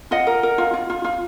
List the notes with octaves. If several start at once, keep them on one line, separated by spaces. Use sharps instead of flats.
F4 D#5 F#5
A#4
A#4
F4
F4
F4
F4